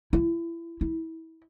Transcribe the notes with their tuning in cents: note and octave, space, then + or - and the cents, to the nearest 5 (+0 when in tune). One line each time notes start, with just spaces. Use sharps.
E4 +25
E4 -25